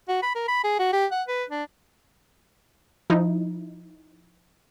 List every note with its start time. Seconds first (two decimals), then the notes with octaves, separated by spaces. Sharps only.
0.08 F#4
0.23 B5
0.35 A#4
0.48 B5
0.64 G#4
0.79 F#4
0.93 G4
1.12 F#5
1.28 B4
1.50 D4
3.10 F3 D#4 E4